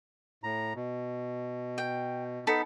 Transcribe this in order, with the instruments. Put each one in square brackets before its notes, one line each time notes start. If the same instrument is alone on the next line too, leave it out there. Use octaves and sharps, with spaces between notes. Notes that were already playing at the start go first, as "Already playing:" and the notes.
[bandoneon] A2 A#5
B2
[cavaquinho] G5
[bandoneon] B3 D#4 [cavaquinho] A4 B5